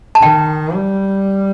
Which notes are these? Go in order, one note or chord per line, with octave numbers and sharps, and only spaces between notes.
A5
D#3 G5
G3